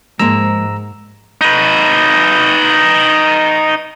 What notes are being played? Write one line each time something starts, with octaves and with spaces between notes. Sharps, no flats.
G#2 F3 G#3 A#3 A#5 E6
D#4 B4